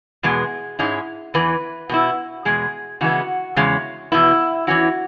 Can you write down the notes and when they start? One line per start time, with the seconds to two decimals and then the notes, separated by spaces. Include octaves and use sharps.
0.23 E2 B2 G#3 B3 G#4
0.79 G#2 G#3 C#4 E4
1.34 E2 E3 B4
1.89 B2 B3 E4
2.45 E2 B2 G#3 G#4
3.01 C#3 E3 G#3 B3 F#4
3.56 E2 C#3 G#3 C#4
4.12 E2 B2 B3 E4
4.67 E2 E3 C#4 E4 F#4